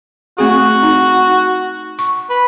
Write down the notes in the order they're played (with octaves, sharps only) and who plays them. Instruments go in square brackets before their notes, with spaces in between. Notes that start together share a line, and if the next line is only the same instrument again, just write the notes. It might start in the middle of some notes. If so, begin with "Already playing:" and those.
[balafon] A3 C4 G#4 [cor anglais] F#4
[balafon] D#4
C#6
[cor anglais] B4